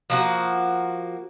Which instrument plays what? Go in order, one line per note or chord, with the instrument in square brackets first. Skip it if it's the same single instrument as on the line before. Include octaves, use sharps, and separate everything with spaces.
[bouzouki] F3 A#3 F#4